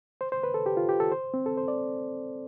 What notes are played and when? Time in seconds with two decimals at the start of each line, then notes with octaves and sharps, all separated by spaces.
0.21 C5
0.32 C5
0.43 B4
0.54 A4
0.66 G4
0.77 F4
0.89 G4
1.00 A4
1.12 C5
1.34 C4
1.46 A4
1.57 C5
1.68 D5